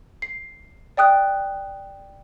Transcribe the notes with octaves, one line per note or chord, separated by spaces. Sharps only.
C7
D5 G5 D#6 F#6